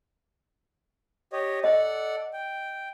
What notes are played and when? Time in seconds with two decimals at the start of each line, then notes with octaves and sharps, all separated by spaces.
1.32 G4 C#5 D#5
1.64 A4 D5 D#5 F#5
2.33 G5